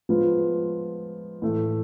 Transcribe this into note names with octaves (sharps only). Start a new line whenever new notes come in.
F3 G#3 B3 F4 B4
A2 E3 A3